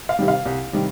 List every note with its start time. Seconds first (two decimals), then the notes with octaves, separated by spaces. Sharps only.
0.09 F5
0.19 C3 D#3 G3
0.28 F5
0.46 C2
0.73 C3 D#3 G3